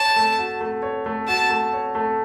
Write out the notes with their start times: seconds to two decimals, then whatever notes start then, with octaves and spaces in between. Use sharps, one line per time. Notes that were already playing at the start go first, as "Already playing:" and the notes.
Already playing: C#5 A5
0.16 A3
0.38 F#4
0.61 A3
0.83 C#5
1.06 A3
1.28 F#4 A5
1.50 A3
1.73 C#5
1.95 A3